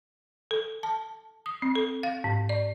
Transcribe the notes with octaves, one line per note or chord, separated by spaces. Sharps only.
A4
A5
D#6
C4
A4
F5
G#2
D5